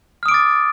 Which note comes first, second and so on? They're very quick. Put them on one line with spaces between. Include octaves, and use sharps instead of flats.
F6 D#6 D7 D6 A6